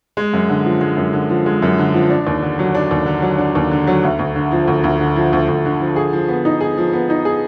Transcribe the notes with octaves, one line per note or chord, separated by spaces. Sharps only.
G#3
F#2
D3
F3
G#3
F#2
D3
F3
G#3
F#2
D3
F3
D4
D#2
D3
F#3
D4
D#2
D3
F#3
D4
D#2
D3
F#3
D2
D2
D3
F3
D2
D2
D3
F3
D2
D2
D3
F3
G#4
F3
B3
D#4
G#4
F3
B3
D#4
G#4